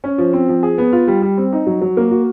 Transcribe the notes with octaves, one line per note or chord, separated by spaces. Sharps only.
C#4
F3
C4
F3
G#4
B3
F4
G3
G3
C4
D#4
F#3
F#3
A#3
F#4